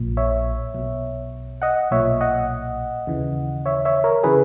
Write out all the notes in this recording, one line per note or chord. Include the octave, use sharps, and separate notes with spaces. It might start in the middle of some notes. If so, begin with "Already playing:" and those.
Already playing: A#1 A#2
C#5 E5
B1 B2
D#5 F#5
B1 A#2 C#5 E5
D#5 F#5
D#2 C#3 E3
C#5 E5
C#5 E5
A#4 C#5
C#3 E3 G#4 B4